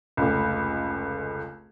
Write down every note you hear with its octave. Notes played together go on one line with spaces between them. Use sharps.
F1 C#2